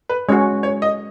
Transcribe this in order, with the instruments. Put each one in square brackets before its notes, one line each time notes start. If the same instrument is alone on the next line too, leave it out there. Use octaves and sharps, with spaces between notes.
[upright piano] B4
[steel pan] G#3 C#4 F#4 [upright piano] C#5
[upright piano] C#5
D#5